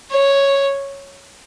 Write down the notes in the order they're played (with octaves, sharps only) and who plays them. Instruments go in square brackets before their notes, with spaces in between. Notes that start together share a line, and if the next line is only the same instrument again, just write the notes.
[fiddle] C#5